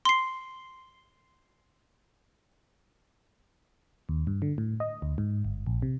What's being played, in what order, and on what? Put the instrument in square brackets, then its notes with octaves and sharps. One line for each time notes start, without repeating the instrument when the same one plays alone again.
[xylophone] C6 C7
[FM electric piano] D#2
G2
D3
A2
D#5
D2
G#2
G1
A#1
C3